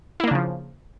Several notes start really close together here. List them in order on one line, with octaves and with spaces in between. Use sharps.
E4 A#3 D4 C#3 F3